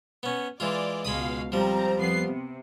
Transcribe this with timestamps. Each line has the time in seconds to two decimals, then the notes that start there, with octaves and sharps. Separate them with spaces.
0.23 B3 C#4
0.60 E3 G#3 F4 D5
1.05 C#2 B2 G#3 F5 B5 D#6
1.52 F3 G3 C4 A#5
1.97 F2 B3 C7
2.26 C3